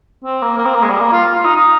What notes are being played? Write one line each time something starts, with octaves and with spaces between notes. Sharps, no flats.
C4
A#3
A#3
C4
A#3
G#3
G3
A#3
F4
F4
D#4
D#4